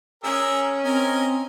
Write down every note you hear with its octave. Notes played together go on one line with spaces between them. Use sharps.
C#4 G#4 A#4 E6
C4 A#4 D#5 G#5